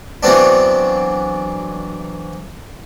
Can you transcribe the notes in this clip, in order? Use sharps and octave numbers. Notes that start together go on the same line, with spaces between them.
E3 F#3 B3 C4 D4